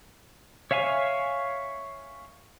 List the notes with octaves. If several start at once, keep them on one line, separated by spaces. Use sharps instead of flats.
C#5 E5 F5 G#5 C#6